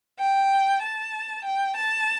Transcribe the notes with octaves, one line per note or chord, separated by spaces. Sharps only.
G5
A5
G5
A5